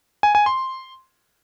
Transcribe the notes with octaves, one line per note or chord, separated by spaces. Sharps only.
G#5
G#5
C6